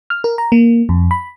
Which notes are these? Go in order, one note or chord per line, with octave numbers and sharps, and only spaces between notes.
F6
A#4
A#5
A#3
F2
B5